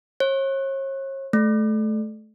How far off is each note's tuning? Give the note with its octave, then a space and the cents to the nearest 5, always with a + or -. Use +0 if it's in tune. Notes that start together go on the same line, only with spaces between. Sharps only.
C#5 -40
A3 -25